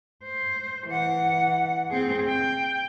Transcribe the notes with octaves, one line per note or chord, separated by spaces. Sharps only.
C5
E3 F#5
C4 G#4
G5